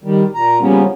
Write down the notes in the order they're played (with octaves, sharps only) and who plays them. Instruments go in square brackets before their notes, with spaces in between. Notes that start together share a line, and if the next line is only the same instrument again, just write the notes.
[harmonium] D#3 G3
A#2 A#5
C#3 F3 G3 A#3 B3 C#4